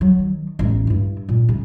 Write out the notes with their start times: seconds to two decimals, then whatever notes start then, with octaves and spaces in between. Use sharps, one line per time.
0.01 F#3
0.19 D#3
0.59 A1 E2
0.87 G2 E4
1.29 A#2
1.49 C#3